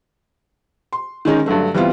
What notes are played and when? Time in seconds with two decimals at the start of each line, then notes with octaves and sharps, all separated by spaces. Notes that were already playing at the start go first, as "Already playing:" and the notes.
0.93 C6
1.25 D#3 G#3 C#4 D#4
1.46 G2 D3 F#3 A3
1.74 E3 G3 B3 C4 F4